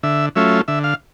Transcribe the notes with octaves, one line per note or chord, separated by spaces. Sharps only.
D3 E5
F#3 A3 C#4 F4 E5
D3 E5
F5